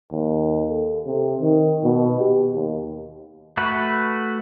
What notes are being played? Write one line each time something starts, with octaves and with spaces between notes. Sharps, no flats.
D#2
A4
C3
D#3
B2
G4
D#2
A3 F#4 B4